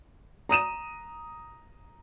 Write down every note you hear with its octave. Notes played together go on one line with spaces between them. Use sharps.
A#5 D#6 D#7 E7